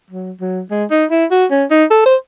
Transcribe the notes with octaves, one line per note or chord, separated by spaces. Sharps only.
F#3
F#3
G#3
D#4
E4
F#4
C#4
D#4
A4
C5